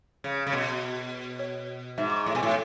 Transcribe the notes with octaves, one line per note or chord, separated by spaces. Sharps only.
C#3
C#3
B2
C#5
G#2 E5
D6
C#6
A2
B2 G#5
A2